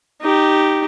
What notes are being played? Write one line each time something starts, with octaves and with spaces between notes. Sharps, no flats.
D#4 G4